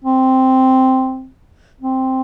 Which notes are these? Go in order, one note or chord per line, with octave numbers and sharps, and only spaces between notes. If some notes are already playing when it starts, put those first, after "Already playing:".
C4
C4